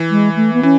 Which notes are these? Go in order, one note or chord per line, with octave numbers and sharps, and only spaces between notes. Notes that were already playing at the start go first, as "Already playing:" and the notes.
Already playing: E3
G#3
A3
B3
E3 C#4